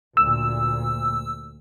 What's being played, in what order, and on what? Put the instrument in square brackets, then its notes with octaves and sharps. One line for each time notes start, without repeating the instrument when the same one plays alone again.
[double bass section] D2 A#2 [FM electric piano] E6